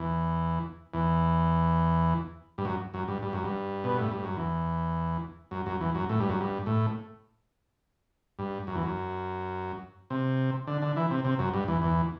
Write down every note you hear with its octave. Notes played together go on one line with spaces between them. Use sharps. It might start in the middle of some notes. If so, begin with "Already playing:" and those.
Already playing: E2
E2
G2
F#2
F#2
G2
G2
F#2
G2
B2
A2
G2
F#2
E2
F#2
F#2
E2
F#2
A2
G2
F#2
G2
A2
G2
F#2
E2
F#2
C3
D3
D3
E3
C3
C3
F#2
G2
E2
E2